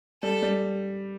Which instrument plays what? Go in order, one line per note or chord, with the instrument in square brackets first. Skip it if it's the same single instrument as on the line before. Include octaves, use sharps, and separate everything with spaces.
[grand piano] G3 [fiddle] A4
[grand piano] G3